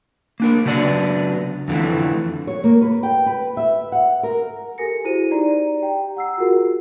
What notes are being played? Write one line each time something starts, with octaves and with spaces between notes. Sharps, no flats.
A#3 D4 A#4
C#3 F#3 B3 D4 D5
F2 D3 E3 A3
C#5
A#3
B4
G5
B4
E5
F#5
A#4
G4 A4 A#4 G#5 A#6 C#7
E4 F#4 G#4 C5 D#7
D#4 G4 D5 A#5
G4 G5 A#5
F#5 E6 C7
F4 F#4 G#4 A#4